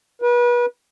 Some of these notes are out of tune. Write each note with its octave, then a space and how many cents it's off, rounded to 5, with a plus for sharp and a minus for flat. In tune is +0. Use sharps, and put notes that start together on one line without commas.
B4 -35